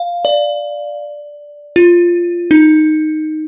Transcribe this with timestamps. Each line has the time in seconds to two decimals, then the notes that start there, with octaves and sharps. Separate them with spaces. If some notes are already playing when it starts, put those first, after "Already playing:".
Already playing: F5
0.25 D5
1.76 F4
2.51 D#4